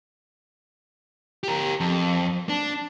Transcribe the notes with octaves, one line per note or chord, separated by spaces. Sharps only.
G4 A#4
F2
D4